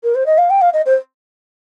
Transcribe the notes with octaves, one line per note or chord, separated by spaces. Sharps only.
A#4
C5
D#5
F5
G5
F5
D#5
C5